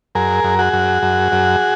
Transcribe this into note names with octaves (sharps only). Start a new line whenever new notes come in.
F#2 G#4 A#4
F#2
F#4 G#4
F#2
F#2
F#2